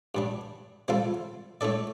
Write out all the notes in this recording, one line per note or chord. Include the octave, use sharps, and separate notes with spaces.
G2 G3 D4
G3 C4 F4 A4 F5
A2 A3 D4 A4 D5